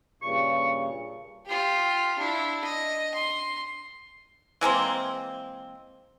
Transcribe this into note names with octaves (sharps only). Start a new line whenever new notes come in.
G2 A#2 C#3 C#6
F4 G4
D4 E4
D#5
C6
E3 G#3 A#3 C4